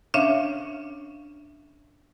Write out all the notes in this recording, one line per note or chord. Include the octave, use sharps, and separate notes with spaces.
C#4 D4 C#5 E5 F5